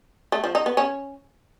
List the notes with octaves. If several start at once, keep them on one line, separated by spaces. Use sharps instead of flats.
A3
F3
D#4
B3
C#4